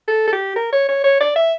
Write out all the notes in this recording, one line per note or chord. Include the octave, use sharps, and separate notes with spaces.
A4
A4
G4
A#4
C#5
C#5
C#5
D5
E5